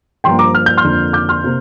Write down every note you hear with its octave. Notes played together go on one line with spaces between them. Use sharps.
G2 F3 A#3 G5 C6
A#5 D6
F6
G6
C6 F6
F2 D3 A#3
D6 G6
C6 F6
C3 A#3